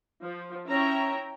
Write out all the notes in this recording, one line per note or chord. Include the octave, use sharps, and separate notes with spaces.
F3
C#4 E4 C#5 E5 G5 A#5